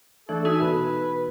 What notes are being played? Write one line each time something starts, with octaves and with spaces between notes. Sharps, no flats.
E3 A3 D4 A4
D#4 F#4 E5 G#5
B2 B4